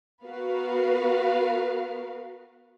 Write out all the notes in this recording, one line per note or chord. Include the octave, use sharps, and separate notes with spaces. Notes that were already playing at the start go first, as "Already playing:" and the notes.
B3 F#4 A#4 B4 F5